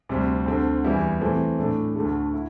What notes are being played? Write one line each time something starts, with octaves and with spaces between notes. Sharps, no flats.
D2 C3 G3 C4
D2 D3 C4
E2 E3 G3 E4
E3 A3 C4
A2 A3 D4
D2 D3 A3
E4